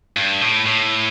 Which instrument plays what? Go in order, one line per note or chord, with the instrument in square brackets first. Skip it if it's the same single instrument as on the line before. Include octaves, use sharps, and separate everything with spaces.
[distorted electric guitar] G2
A2
A2